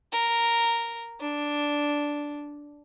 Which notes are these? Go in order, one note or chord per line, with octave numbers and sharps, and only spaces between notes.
A#4
D4